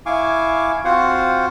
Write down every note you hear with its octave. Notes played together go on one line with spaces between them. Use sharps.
E4 F5 G#5 C#6 D6
C4 F4 F#4 C5 F5 F#5